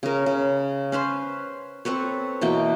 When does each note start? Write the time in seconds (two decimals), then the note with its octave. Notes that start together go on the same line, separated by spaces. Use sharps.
0.03 C#3 A#4
0.26 C#3
0.92 C#4 B4 C5 C6
1.85 C4 A4 B4 C#5
2.41 B2 E3 A#3 G5